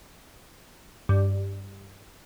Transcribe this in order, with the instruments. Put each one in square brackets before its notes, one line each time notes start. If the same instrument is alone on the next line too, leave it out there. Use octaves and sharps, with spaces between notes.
[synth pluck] G2